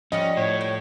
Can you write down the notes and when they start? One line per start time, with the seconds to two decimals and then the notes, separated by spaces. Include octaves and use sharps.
0.12 F3 G3 C#4 F#4 D#5
0.37 A2 C#5
0.61 G5